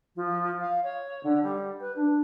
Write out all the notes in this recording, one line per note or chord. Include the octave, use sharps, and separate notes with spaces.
F3
F5
C#5
D3
G3
B4
D4